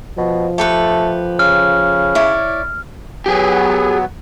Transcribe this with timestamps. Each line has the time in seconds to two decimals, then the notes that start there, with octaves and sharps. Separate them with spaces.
0.18 B2 F3
0.58 A3 G4 A4 B4
1.39 C#3 F6
2.15 E4 C#5 D5
3.26 F#3 B3 G4 G#4